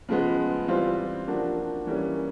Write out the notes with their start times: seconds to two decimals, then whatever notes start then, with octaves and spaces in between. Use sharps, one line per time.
0.08 C#3 F3 G#3 B3
0.68 E3 G3 C4 F4
1.27 F3 A#3 D4 F#4
1.87 E3 G3 A#3 C#4